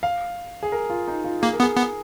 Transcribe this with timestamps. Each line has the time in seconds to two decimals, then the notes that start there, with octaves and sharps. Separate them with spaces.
0.03 F5
0.63 G#4
0.72 A#4
0.90 F4
1.08 D#4
1.24 F4
1.42 A#3 G#4
1.53 A#4
1.60 B3
1.63 G#4
1.77 B3